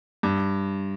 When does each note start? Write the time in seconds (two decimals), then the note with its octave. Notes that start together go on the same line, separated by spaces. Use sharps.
0.23 G2